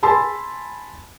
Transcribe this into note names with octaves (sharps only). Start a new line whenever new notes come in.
G#5 A5 B5 C6 E6